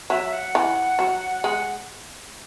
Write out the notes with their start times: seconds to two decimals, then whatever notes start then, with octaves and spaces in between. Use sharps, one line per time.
0.10 F#3 E5
0.33 F#5
0.55 E3
0.99 F#3
1.44 G#3 F#5